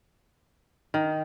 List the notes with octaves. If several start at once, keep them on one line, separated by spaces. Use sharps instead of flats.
D#3